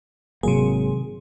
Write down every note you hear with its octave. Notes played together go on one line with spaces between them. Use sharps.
G#1 C3 F#3 A#3 G#4